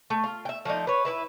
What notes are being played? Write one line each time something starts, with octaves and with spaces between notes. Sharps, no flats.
A3
F4
E5 G5
F3 A3 D4 D#4
B4 C#5
E4 B4 E5